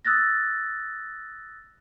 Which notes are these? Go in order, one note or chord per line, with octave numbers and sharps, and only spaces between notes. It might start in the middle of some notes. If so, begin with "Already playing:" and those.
D#6 E6 F#6 A6 A#6